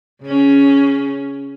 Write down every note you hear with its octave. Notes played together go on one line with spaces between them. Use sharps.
C#3 C#4